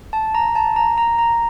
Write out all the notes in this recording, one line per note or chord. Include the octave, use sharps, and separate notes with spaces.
A5
A#5
A5
A#5
A#5
A#5